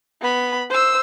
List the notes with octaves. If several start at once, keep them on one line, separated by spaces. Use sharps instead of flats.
B3 B5
C5 E6